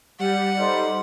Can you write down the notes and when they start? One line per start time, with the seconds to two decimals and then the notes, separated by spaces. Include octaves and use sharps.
0.19 G3 F#5
0.59 D#4 A4 C5